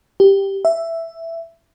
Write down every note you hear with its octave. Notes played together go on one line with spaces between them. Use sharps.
G4
E5